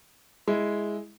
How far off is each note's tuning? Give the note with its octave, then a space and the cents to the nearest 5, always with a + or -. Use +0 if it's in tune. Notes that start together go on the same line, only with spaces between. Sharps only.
G#3 +0 E4 +0